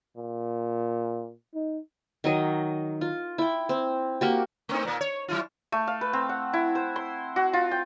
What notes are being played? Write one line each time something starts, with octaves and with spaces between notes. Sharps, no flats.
A#2
D#4
D#3 F#3 D#5
F4
E4 G5
C4
A#3 F#4 G4
A3 C4 D#4
A#2 A#3
C#5
F#3 E4 F4
A3
F5
B4
C4
F#5
E4
C5
C6
F#4
F4
G5